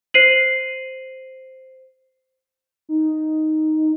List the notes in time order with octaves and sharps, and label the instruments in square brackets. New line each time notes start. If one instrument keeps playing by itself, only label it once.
[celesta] C5 C7 D#7 F#7
[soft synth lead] D#4